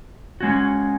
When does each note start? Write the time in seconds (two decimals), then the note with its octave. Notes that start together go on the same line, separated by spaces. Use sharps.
0.41 G#3 C#4 F#4